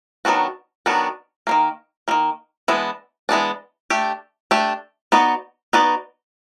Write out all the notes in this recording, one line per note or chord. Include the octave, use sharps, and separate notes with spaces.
D#3 F#3 B3 D4 F#4
D#3 F#3 B3 D4 F#4
D#3 G3 A#3
D#3 G3 A#3
E3 G#3 B3 D4
E3 G#3 B3 D4
A3 D4 G4
A3 D4 G4
B3 D#4 F#4 B4 D5
B3 D#4 F#4 B4 D5